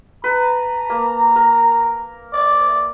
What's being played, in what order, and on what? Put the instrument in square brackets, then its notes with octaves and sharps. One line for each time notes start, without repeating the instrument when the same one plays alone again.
[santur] B4 [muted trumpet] A#5
[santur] A#3
A#4
[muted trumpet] D5